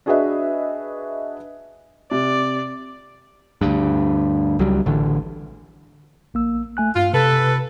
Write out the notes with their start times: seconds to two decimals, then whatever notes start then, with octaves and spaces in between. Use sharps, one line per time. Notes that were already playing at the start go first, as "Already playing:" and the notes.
0.06 D4 F#4 G#4 B4 D#5 E5
2.11 C3 D5
3.61 D2 G2
4.59 C#2 F#3 G3
4.86 A1 D3
6.34 A#1 A#3 E6
6.77 A3 G#5 F#6
6.96 G2 F4
7.13 C3 A4 B4